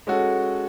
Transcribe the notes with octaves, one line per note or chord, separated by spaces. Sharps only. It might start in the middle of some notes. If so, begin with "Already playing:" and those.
G#3 C#4 F#4 A4